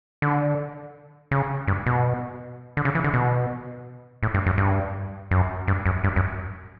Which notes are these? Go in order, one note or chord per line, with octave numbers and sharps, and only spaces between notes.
D3
C#3
G2
B2
D3
C#3
E3
D3
B2
A2
G2
F#2
G2
F#2
G2
F#2
G2
F#2